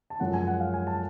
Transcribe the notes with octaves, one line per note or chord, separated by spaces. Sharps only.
A5
F#2 F3 G#3 C#4 F#5
G#5
F#5
F5
G#5
A5